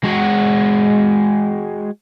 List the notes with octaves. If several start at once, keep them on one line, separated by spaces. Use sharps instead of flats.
G#3 F#4